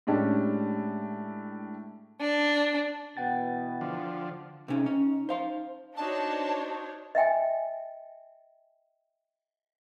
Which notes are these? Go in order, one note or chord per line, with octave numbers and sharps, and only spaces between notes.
A2 G#3 C#4 D4 G4 A4
D4
B2 E3 B3 F#5 G5 A6
D3 F3
C3 C#4 D#4
C#4
C5 F5 C6
D4 D#4 F#4 C5 C#5 A5
D#5 E5 G5 G#5